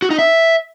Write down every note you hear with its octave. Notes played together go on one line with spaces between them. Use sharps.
F#4
D#4
E5